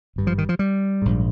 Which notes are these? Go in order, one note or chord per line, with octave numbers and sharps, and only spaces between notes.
G#1 G2
F3
D#3
F3
G3
A#1 G#2